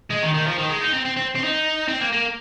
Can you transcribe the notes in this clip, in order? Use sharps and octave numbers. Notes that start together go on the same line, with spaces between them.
G#3
D#3
D#3
F3
D#3
G#3
D#4
C4
C4
C4
C4
D#4
C4
A#3
A#3